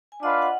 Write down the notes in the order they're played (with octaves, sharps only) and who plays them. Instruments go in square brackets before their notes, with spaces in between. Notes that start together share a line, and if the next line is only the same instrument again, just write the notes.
[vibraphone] G#5
[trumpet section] D4 F4 B4 F5 [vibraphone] D#5 F#5
[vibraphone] F#5